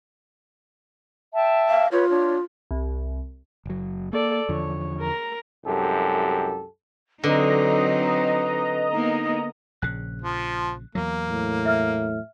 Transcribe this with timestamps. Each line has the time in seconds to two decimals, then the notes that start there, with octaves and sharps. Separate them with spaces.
1.34 E5 G5 A5
1.69 F5
1.92 F4 B4 C#5
2.09 D4 C#5
2.71 C2
3.66 F#1 F#3
4.13 A#3 A4 D5
4.49 E2 D3 F3 C#5
5.00 A#4 A#5
5.65 C2 F#2 G#3 G4 A4
7.24 D3 F#3 C4 D#4 B4 D#5 A#5
8.93 A#3 B3 D#4
9.82 A#1 C#3 F#6
10.22 F3
10.95 E2 F#3 A#3
11.27 A2
11.66 E5 F6